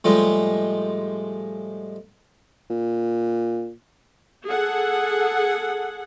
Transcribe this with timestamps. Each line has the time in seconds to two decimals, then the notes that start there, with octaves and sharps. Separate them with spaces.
0.04 A2 F3 G3 G#3
2.70 A#2
4.46 G#4 A4 F#5